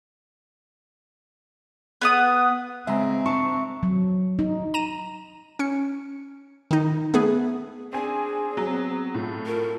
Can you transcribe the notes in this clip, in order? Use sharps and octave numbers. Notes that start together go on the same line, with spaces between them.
B3 F#5 D#6
C#3 G#3 C4 E5 A#5
D4 A5 C#6
F#3
D#4
A#5 D#7 E7
C#4 C#7
D#3 D#4
A3 B3 G#4
C4 D4 G#4 G#5
F#3 B3 C4
A2 F4 A4
A#4